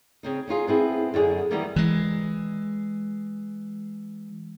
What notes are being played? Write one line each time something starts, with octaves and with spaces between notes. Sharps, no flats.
C#3 C4 D#4
C#4 D#4 F4 G#4
B3 C4 E4 G#4
F#2 D3 F#4 G#4
D#3 E3 G3 A#3 B3 D#4
E3 G#3